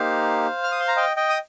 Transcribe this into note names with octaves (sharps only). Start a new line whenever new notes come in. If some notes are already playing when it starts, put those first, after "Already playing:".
Already playing: A#3 D#4 G4 C5 F5
F6
D#6
C6
A#5
D#5 G5
D#5 G5
D#6